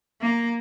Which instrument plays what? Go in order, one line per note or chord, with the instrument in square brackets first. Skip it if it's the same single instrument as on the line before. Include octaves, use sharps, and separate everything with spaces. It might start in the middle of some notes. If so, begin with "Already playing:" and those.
[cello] A#3